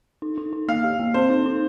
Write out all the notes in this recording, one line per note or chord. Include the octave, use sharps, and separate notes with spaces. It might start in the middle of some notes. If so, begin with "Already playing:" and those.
D#4
D#4
D#4
A#3 F5
G4
A#3
C4 C5
D#4
D#4